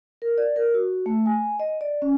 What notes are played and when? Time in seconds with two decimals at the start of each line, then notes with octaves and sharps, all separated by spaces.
0.22 A#4
0.38 D5
0.56 A#4
0.74 F#4
1.06 A3
1.26 G#5
1.60 D#5
1.81 D5
2.02 C#4